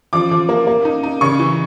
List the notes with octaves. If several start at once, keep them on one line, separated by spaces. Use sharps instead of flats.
F3 D6
F3
A#3
A#3
D#4
D#4
C#3 C#6
E3